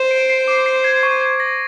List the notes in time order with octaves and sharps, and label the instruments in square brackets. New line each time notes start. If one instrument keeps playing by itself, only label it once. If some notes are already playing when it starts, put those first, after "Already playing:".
Already playing: [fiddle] C5
[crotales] D7
C7
D6
C7
G#6
C#6
G#6
A#6